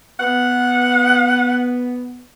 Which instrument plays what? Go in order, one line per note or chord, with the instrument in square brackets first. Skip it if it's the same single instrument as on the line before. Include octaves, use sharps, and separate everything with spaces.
[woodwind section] B3 [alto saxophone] F#5